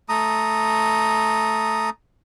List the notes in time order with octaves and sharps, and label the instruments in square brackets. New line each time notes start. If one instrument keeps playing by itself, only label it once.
[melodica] A3 A#5 D#6